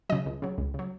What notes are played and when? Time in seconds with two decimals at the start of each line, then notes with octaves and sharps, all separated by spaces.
0.09 C#3 F#3 D#5
0.26 C#2
0.42 C#3 F#3
0.58 C#2
0.74 C#3 F#3